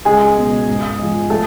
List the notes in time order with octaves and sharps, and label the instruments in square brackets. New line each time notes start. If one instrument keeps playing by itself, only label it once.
[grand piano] C#2 G#3 G#4
B2 G#3
G#2
F3 G#3
A3 A4